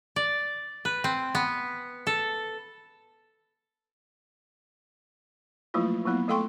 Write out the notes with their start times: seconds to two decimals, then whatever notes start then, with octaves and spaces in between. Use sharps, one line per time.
0.16 D5
0.85 B4
1.04 C4
1.35 B3
2.07 A4
5.74 F3 F#3 A3 A#3 E4 F4
6.06 F#3 A#3 B3 E4
6.28 A3 A4 F5 G5 C6 C#6